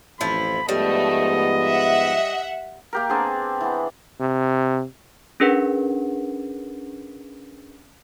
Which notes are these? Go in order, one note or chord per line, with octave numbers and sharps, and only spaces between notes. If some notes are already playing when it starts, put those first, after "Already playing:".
A1 F2 F3 E4 B5
G#2 F3 G3 A3 B3 D#5
E5 F#5
A#3 G4 A#4
B3 C4 D4 G#4
E3 B3
C3
C#4 D4 G#4 A#4 B4 F#5